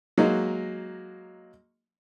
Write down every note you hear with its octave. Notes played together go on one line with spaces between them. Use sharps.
F#3 G#3 A#3 D#4 F#4